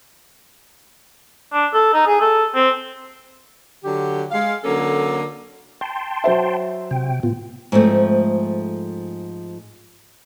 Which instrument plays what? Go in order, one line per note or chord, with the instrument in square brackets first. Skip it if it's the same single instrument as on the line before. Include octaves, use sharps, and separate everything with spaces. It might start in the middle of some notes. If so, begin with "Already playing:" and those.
[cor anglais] D4
A4
D#4
G#4
A4
C4
[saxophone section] D3 F#3 G4
G#3 F5
D3 F#3 A#3 C#4 A4
[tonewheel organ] G5 A5 C6
[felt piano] F#3 C5 E5
[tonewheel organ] C3 G5
A2 B3 F4
[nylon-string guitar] G#2 F3 A3 C4